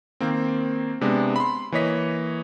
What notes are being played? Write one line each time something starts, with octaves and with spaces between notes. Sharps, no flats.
D#3 A#3 C4
C3 G#3 B3 D4
B5 C6
E3 A#3 C#5 D#5 B6